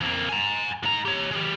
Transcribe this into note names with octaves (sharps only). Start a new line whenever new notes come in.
F2 A#3
G#5 A#5
G#2 A#5
G4 C#5
G#3 G4